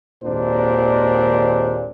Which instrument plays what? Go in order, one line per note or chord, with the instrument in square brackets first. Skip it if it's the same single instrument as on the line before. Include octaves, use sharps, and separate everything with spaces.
[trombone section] G#1 D#2 A#2 D4 C5